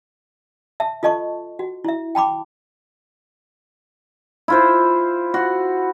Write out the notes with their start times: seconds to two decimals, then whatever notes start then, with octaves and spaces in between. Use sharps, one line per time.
0.80 E5 A5
1.03 F4 A4 D#5 A5 C#6
1.59 F#4
1.84 E4 E5
2.15 G5 A5 B5 D6
4.48 E4 F4 C5
5.34 F#4